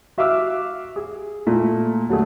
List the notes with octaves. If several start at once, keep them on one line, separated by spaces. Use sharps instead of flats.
F#4 E5 F5 D6 E6 F6
G#4
A#2 A3
D3 F#3 A3 G#4